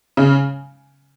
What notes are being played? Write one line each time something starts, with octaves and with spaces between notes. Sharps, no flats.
C#3